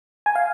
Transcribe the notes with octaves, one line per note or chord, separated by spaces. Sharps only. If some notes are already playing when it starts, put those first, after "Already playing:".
G#5
F5